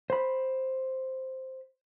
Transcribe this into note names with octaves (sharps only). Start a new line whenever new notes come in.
C5 B5